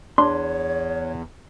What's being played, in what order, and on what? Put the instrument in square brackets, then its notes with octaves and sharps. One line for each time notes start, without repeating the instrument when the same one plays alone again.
[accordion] E2 [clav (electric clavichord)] D4 [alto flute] C#5 [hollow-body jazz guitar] C6